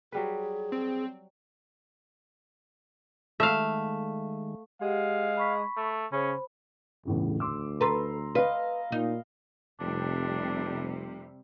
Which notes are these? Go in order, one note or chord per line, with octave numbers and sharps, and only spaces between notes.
F#3 G3 G#4 B4
C4
D#3 G#3 A3 E5 F5
G#3 G4 F5 F#5
B5 C#6 B6
A3
C#3 C#4 C5 B5
G1 E2 A2 C#3
D2 C6 D6 E6
A4 B4 A#5 C6
B4 D#5 F5
A#2 D#4
F1 C3 G3 D4